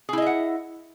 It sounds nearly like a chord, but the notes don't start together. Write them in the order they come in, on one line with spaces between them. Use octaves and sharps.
G#4 E4 D#5 E5 F#5